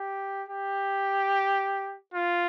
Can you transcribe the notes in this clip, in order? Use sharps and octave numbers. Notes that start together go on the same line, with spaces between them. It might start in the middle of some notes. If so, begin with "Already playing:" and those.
Already playing: G4
G4
F4